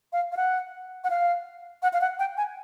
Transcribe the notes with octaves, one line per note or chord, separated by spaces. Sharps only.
F5
F5
F#5
F#5
F5
F#5
F5
F#5
G5
G#5